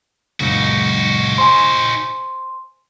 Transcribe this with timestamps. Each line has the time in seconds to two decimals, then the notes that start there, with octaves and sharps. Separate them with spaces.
0.40 C#2 F#2 A#2 D#4 F#4
1.38 C5 G#5 C6